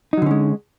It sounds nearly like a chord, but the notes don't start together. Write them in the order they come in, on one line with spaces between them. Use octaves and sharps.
D#4 F#3 D3 C#4 G#3